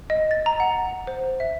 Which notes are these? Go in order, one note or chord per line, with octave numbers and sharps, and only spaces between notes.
D#5
A6
A#5
F#5
C5
E5